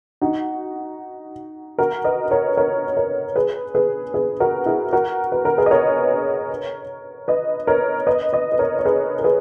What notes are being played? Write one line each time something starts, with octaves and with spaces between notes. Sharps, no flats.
D#4 F#4
F#4 A#4
B4 D#5
A#4 C#5
A#4 C#5
A#4 C#5
G#4 B4
G#4 B4
G#4 B4
F#4 A#4
E4 G#4
F#4 A#4
B4
A#4
G#4 B4
D#5
A#4 C#5
B4 D#5
A#4 C#5
B4 D#5
B4 D#5
B4
A#4 C#5
C#5
G#4 B4
A#4
G#4 B4